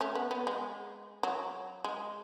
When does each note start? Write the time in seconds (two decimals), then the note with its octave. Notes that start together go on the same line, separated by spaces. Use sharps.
0.01 A3 C#4
0.15 B3
0.31 B3
0.47 G#3
1.23 F#3
1.84 G#3